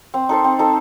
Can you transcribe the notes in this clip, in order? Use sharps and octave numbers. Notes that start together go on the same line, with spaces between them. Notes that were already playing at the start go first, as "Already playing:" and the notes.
C4
D#4 A4 C5
C4
D#4 A4 C5